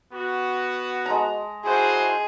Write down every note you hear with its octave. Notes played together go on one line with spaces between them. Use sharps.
B3 F#4
G#3 A5 A#5
E4 F#4 G#4 C5